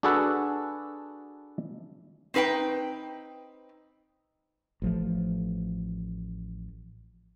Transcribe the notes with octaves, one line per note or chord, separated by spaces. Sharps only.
D4 F#4 G#4 A4 B4 F#5
C4 D#4 B4 F5 G5
A1 F3 A3